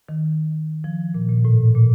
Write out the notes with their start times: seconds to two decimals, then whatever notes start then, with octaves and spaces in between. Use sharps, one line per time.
0.09 D#3
0.84 F3
1.14 A#2
1.29 A#2
1.45 A2
1.75 A#2